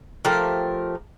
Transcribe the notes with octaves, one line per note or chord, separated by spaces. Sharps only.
F3 A3 G4 A#4